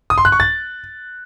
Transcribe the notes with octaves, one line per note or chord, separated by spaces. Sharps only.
D#6
C6
F#6
C#6
A6